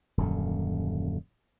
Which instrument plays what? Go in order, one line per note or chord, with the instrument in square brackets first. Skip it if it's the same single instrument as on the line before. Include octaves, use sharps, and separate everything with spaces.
[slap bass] D#1 F#2 D3